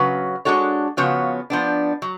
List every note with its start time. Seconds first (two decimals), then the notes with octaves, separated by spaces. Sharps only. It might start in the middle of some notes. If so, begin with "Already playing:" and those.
Already playing: C#3 F#3 C#4 F#4 B4
0.45 G#3 D4 F#4 A4 C#5
0.97 C#3 F3 B3 F#4 C#5
1.50 F3 B3 D4
2.02 F#3